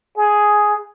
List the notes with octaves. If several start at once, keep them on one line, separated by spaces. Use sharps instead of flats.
G#4